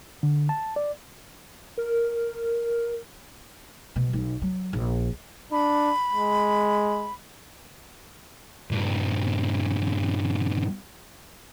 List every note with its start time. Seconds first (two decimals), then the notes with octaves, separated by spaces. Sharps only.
0.23 D3
0.49 A5
0.76 D5
1.78 A#4
3.96 B2
4.13 B1
4.42 F#3
4.73 A#1
5.52 D4 B5
6.12 G#3
8.71 G2 A#2